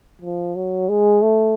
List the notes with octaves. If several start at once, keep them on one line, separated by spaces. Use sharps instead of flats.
F3
F#3
G#3
A3